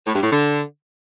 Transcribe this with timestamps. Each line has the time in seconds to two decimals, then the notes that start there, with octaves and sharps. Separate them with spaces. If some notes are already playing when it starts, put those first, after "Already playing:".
0.07 A2
0.15 G2
0.23 A2
0.31 D3